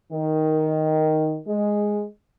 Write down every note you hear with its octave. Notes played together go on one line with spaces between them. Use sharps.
D#3
G#3